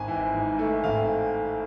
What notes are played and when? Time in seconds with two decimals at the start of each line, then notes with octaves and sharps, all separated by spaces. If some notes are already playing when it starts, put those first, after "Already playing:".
Already playing: G#1 G#5
0.08 E3
0.33 G#2
0.59 A3
0.84 G#1 F5